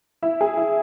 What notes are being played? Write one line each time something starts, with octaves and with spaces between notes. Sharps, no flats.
E4
G#4
E4